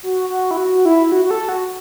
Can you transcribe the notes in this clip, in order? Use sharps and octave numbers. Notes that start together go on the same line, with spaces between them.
F#4
F#4
E4
F#4
E4
E4
F#4
F#4
A4
F#4